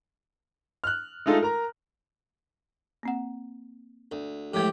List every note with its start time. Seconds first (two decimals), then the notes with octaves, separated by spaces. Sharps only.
0.84 F6 F#6
1.26 G#3 A3 D#4 F4 A4
1.42 A#4 A#5
3.03 A#3 C4 F#5
4.12 D2
4.54 A2 E3 F3 G#3 A3 G4